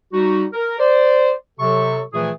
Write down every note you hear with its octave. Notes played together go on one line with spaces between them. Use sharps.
G3 D#4 F#4
A#4
C5 D5
C3 F#3 A4 C#6
A#2 E3 F3 A3 G#4